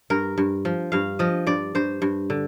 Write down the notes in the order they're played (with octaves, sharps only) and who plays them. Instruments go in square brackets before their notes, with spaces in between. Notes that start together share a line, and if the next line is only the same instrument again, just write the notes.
[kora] G2 A#4
G2
F3
G2 F5
F3 D#5
G2 D5
G2 C5
G2
D3